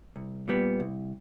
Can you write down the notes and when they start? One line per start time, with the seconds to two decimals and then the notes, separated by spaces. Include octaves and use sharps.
0.16 C2
0.48 A#2 G3 B3
0.80 C2